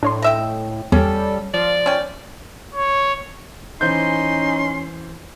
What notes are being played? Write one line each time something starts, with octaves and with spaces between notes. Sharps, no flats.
A2 D4 C#5 C6
D#5 E5 G5
E2 G3 C#4 A4
F3 D5
C#4 G5
C#5
E3 C#4 D#4 C5 C6 G6